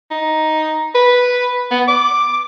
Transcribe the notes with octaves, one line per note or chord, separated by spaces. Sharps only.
D#4
B4
B3
D6